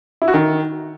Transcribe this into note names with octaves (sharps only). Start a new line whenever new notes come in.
E4
F#4
D#3